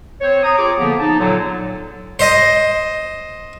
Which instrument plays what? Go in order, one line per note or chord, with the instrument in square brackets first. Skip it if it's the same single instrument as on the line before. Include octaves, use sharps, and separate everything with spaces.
[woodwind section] C4 C5 C#5
A#5 D#6
F4 G#4 D6
D3 F3 A#3 B3
D#4 A5
A#2 D3 F#3
[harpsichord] C5 D#5